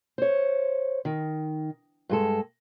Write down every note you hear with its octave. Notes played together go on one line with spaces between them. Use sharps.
C5 C#5
D#3
G2 G#3 A4